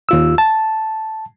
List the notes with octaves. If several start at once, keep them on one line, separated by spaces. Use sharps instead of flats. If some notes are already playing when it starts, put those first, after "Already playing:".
D#2 F4 E6
A5